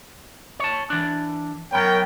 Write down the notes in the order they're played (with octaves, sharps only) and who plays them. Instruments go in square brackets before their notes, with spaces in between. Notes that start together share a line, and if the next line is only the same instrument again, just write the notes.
[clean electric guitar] C#5 A5
E3 D4
[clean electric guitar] F#2 B3 [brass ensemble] A#4 C#5 G5